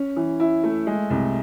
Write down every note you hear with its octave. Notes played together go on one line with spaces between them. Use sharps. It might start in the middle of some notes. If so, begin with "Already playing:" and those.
Already playing: C#4
E3
E4
A3
G#3
C2